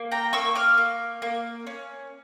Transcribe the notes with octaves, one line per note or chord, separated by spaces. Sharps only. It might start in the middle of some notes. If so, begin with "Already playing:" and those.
Already playing: A#3
G5 A#5
A#3 C#6 E6
D6 F6
A#3
A#3
C#4